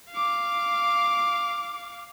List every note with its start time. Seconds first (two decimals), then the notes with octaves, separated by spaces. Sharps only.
0.11 F5 D6